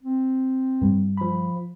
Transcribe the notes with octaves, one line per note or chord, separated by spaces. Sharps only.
C4
G2 G3
F3 B5